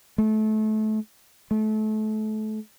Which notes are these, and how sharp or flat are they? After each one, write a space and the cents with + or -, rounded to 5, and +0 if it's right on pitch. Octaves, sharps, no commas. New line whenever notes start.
A3 -25
A3 -30